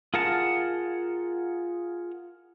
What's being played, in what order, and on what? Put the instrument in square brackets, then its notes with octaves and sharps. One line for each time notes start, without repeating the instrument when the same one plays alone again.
[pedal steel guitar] F4 G#4 A#4 F#5 A5